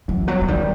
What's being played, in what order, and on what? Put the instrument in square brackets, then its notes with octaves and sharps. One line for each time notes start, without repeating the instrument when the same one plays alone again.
[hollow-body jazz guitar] F#2 [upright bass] E3
[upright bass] F#3 [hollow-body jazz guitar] B3
[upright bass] F#3
[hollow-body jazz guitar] D#3 [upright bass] G3